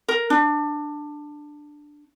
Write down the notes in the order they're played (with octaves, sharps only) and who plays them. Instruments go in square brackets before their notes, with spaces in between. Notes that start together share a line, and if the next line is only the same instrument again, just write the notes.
[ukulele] A#4
D4